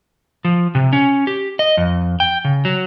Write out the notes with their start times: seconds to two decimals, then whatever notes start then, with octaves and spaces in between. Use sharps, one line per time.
0.45 F3
0.75 C3
0.93 C#4
1.27 G4
1.59 D#5
1.77 F2
2.20 G5
2.45 C#3
2.65 F#3